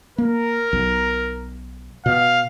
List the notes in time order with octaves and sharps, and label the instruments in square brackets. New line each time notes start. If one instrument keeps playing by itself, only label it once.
[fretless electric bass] A#3 [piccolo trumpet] A#4
[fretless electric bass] B1
[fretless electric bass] B2 [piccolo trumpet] F5